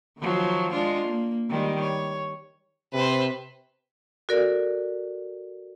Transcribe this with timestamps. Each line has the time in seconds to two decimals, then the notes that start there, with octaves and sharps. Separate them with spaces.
0.19 D#3 F3 F#3
0.72 G#3 D4 F4
1.08 A#3
1.50 D#3 G3 G#3
1.81 C#5
2.93 C3 B4 C5
4.29 F#4 A4 A#4 D5